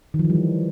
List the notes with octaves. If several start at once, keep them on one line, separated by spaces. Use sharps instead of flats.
D#3
F3
E3
G3
E3